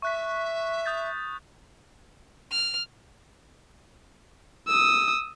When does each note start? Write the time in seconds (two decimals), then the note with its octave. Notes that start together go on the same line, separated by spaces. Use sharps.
0.02 E5 C#6 F#6 B6
0.86 D#6 G6 A6
2.52 F6
4.67 D#6 E6